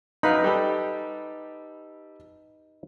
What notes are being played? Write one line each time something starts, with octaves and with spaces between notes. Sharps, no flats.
F#2 D#4 B4 F5 B5
G3 G4 A4